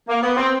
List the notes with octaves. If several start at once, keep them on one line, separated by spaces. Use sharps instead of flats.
A#3
B3
C4